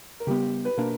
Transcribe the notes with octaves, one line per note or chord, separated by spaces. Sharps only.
A#4
C#3 G3 B3 G4
B4
B2 A#3 D4 A#4